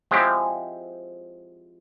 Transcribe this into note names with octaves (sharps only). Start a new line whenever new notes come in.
F3 G#3 C4 E4 G4